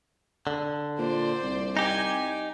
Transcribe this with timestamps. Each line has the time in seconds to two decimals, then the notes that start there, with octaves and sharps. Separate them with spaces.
0.47 D3
0.98 A#2 C5 D5
1.43 C2
1.77 D#4 G4 G#5